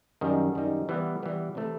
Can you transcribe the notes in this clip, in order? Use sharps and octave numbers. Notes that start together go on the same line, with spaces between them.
F#2 D#3 G3 D#4
F#2 D#3 G3 D#4
E3 G3 B3
E3 G3 B3
C3 E3 A3